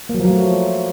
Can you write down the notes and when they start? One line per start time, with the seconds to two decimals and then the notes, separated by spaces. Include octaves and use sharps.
0.09 A#3
0.14 F#3
0.20 F3
0.25 F#3
0.30 A3